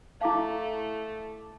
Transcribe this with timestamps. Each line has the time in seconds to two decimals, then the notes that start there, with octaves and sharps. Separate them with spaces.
0.21 A3 E4 F5 A5 D6